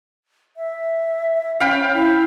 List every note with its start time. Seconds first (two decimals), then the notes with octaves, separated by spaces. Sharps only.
0.57 E5
1.60 C#4 F5 G5 B5
1.93 E4